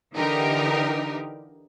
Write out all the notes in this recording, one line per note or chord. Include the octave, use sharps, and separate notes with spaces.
D3 E3 D#4 G4 A#4